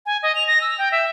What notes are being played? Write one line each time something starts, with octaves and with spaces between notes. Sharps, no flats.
G#5
D#5
F7
A#6
E6
G5
E5